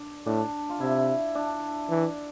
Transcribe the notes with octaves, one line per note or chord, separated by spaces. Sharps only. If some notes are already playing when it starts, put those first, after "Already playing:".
Already playing: D4
A2 D4
F4
C3 E4
D4
E3